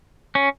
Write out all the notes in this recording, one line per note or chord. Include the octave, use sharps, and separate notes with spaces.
C#4